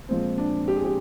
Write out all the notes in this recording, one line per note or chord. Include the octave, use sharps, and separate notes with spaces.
A#2 F3 G#3 C4
D4
G4
G#4
G4